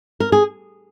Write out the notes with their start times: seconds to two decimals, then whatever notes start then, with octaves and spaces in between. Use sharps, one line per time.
0.20 A#4
0.32 G#4